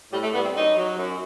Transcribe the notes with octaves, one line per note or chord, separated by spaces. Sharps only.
A2 G3
A3
G3 B3
C4
F#2 D#4
F#3
F#2